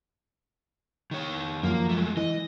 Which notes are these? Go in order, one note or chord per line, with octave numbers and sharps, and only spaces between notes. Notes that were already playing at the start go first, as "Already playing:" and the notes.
D#3 C#5
F#2 F3 A#3
G#3 A3
E3 D#5